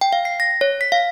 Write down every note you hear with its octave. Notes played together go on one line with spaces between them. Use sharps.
G5
F5
C7
A#6
C#5
B6
F5